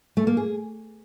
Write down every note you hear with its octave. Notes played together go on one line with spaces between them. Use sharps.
A3
A#3
G#4